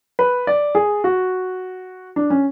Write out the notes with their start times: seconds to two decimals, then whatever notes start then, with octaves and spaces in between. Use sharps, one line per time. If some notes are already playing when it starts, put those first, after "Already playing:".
0.19 B4
0.47 D5
0.75 G#4
1.04 F#4
2.16 D4
2.30 C#4